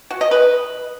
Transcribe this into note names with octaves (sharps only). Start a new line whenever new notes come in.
F#4
D#5
B4